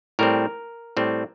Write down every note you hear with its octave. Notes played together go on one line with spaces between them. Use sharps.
A2 G3 C4 A#4
A2 G3 C4